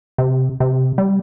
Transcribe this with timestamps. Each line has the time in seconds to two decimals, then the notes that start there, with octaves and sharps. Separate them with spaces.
0.18 C3
0.60 C3
0.98 G3